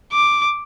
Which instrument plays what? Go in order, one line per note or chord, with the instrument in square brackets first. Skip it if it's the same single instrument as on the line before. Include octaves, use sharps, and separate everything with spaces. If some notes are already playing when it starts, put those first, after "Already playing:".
[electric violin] D6